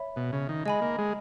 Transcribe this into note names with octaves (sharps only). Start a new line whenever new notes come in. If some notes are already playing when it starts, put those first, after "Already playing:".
Already playing: C#5 E5 B5
B2
C#3
D#3
G#3 D#5 G#5 B5
A#3
G#3